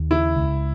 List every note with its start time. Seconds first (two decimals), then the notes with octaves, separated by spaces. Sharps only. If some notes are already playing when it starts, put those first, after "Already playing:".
Already playing: D#2
0.10 C#3 E4
0.36 C#2